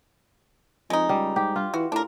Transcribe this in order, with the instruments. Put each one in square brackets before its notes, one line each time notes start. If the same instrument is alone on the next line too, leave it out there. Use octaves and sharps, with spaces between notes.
[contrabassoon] F2 [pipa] G#3 D#4
[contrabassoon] C#2 [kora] G3
[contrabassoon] G#2 [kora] G4
[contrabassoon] G2 [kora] F4
[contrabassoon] E3 [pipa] F#4
[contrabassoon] A2 [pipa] D4 A#4